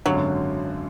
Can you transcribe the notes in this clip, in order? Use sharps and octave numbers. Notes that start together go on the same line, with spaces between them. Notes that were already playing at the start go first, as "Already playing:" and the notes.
G#1 F#2 D3 F#3